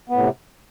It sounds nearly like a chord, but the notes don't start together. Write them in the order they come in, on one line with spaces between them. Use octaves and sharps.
B3 A2 C3